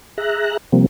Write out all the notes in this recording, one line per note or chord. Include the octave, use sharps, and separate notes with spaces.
G#4 E5 A#5 F#6
C3 F3 G3 A#3 C4